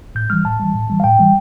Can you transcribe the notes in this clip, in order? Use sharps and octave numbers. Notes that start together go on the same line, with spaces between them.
A2 G6
E3 G3 F6
A2 A5
E3 G3
A2
E3 G3
F5
A2 G5
E3 G3